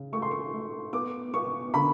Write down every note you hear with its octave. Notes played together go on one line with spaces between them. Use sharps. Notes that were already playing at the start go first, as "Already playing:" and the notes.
Already playing: C#3
A3 C#6
C6
C#6
A3
B3 D6
B3 C#6
D3 B5